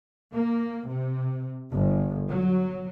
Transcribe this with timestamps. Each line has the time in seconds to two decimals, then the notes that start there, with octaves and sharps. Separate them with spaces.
0.33 A#3
0.87 C3
1.72 G1
2.29 F#3